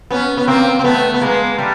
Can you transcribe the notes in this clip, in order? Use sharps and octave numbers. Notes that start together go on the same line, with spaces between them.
B3 C#4
B3
A#3 C4
C4
A3 B3
B3
G#3 A#3
G3 A3